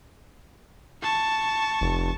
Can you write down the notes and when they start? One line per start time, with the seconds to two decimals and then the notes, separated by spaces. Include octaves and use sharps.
1.03 A5 C#6
1.81 F1